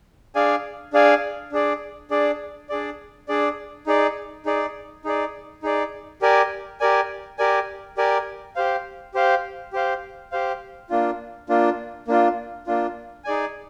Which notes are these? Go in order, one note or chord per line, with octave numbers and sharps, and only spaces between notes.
D4 G#4 D5 F5 G#5
D4 G#4 D5 F5 G#5
D4 G#4 D5
D4 G#4 D5
D4 G#4 D5
D4 G#4 D5
D#4 G#4 D5
D#4 G#4 D5
D#4 G#4 D5
D#4 G#4 D5
G4 A#4 D5 G#5
G4 A#4 D5 G#5
G4 A#4 D5 G#5
G4 A#4 D5 G#5
G4 C5 F5
G4 C5 F5
G4 C5 F5
G4 C5 F5
A#3 D4 F4
A#3 D4 F4
A#3 D4 F4
A#3 D4 F4
D#4 G#4 D5 G#5